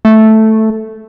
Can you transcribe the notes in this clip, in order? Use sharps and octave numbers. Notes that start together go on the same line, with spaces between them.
A3